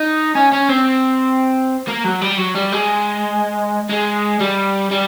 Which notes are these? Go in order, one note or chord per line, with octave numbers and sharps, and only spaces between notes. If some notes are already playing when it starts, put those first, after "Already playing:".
Already playing: D#4
C#4
C#4
C4
A#3
F#3
G3
F#3
G3
G#3
G#3
G3
G3